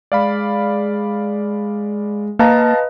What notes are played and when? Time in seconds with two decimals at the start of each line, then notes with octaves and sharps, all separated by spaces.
0.12 G#3 D5 F5 B5
2.39 A#3 B4 D#5 F5 A5 A#5